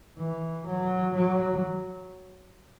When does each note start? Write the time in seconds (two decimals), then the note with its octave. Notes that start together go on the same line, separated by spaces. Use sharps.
0.18 E3
0.66 F#3
1.14 F#3